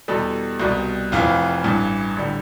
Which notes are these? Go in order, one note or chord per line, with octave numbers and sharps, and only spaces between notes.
E2 B2 G3 A4
C2 B2 G3
F1 F2 E3 F4
A1 G2 E3
A1 D3 G3